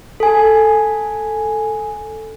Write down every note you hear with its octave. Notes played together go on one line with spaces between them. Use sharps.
A4 G#5